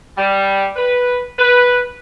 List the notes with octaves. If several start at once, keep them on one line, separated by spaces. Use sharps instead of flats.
G3
B4
B4